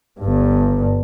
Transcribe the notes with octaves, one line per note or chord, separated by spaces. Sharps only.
G1 G2